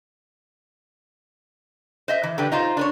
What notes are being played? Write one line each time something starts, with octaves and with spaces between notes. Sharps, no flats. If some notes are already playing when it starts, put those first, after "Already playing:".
C5 D#5 E5
E3
D3 G3 G4 B4
D#4 F4 C5
D4 B4 C#5